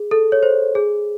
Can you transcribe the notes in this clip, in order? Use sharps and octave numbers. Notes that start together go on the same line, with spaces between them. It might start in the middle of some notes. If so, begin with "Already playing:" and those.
Already playing: G#4
A4
C#5
C5
G#4